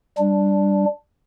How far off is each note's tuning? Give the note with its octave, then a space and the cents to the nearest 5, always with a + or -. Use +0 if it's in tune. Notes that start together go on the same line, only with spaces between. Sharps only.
G3 +0 D4 +0